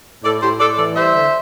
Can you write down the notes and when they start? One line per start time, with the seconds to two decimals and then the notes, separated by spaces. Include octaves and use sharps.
0.25 A2 A4 D5
0.42 A2 G4 C5
0.60 A2 A4 D5
0.78 E3 A4 D5
0.96 G3 C5 E5
1.14 D3